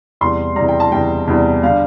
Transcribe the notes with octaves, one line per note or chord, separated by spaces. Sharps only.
E2 C3 G3 C6
E2 C3 G3 A#5
G5
A5
E2 C3 G3 G5
E2 C3 G3
D3 G3 F5